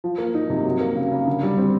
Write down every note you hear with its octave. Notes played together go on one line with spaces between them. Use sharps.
F3
A#3
D#4
C3
F#3
A#3
C#3
C#3
D3
G3
C4